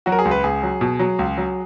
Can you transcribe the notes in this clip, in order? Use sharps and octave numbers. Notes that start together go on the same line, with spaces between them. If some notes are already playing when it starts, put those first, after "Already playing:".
F#3 F#4
A#4
G#4
C#2
B4
C#2 G#4
F#3
B2
F#3
C#2
F#3